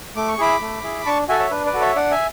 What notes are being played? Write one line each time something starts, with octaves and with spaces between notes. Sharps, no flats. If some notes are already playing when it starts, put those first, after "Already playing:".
A3 D6
C#6
E4 G#4 B5 D6
A3
E4 G#4
D4 A5 C#6
F#4 A4 E5 G#5
C#5 E5
D4 B4
B4 D5
F#4 A4
C#5 E5
D4 D5 F#5
E5 G#5